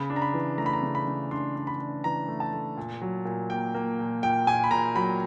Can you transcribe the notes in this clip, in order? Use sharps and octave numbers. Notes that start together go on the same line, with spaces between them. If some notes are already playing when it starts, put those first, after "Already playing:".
Already playing: C#3 B5
D4
A#5
B5
E3
A3 A#5
B5
A#5
C#3
B5
C#3
D4 C6
D4
B5
D4
E3 A#5
A3
A5
A3
A#2
F#3
A#2
A#3 G5
A#3
A#2
A#2 G5
A#2 G#5
B5
A#2 A#5
F#3 B5